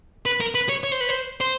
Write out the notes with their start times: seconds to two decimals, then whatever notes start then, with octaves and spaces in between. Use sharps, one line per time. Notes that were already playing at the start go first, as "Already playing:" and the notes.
0.26 B4
0.40 A#4
0.55 B4
0.69 C#5
0.84 C#5
0.92 C5
1.01 B4
1.09 C5
1.41 C5